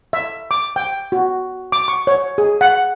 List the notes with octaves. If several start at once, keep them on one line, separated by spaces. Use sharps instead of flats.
E5
D6
G5
F#4
D6
C#6
C#5
G#4
F#5